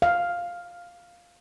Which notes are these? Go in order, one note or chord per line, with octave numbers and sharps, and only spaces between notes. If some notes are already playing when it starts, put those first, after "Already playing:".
F5